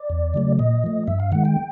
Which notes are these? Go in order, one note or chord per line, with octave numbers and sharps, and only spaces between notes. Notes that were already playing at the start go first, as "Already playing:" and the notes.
Already playing: D5
E2
C#3 F#3 A3
A#2 D#5
F3 A3
G2 E5
F5
D#3 G#3 F#5
G5